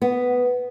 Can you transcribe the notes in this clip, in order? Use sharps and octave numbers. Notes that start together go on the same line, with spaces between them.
B3